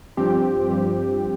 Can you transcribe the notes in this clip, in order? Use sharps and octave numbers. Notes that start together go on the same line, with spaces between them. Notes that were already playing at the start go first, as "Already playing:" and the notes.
G2 F3 C4 G4
G2 F3 C4 G4